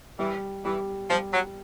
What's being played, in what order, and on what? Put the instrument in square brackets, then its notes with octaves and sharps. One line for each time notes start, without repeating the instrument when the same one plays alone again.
[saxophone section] E3 [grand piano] G3
[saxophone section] E3 [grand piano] G3
[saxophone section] F3 [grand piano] G3
[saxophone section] F#3